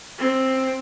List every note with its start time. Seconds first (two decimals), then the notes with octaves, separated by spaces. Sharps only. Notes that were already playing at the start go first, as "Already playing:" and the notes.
0.18 C4